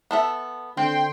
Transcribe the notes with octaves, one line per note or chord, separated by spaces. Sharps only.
B3 A4 E5
D3 C4 G5 C6